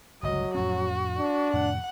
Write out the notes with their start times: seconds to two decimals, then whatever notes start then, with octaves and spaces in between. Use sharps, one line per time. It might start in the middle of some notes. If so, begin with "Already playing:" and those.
0.23 G1 C#2 F#3 D#5
0.55 F2 A2 C#4 F#4
1.18 D4
1.53 F2 A2 C3 F#5